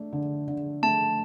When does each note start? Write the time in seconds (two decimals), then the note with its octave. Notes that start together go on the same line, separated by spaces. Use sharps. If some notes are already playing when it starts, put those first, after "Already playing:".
Already playing: A3 D4
0.13 D3
0.48 D3
0.82 A3 A5